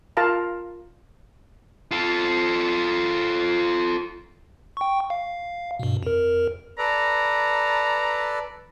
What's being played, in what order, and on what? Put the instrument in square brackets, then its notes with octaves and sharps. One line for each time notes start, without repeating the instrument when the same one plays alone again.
[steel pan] F4 A#4 F5 A5 A#5
[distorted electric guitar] F4 A4
[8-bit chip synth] G5 C#6
F5
G2 B2
F2 A#4
[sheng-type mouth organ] A4 B4 D5 [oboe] A#5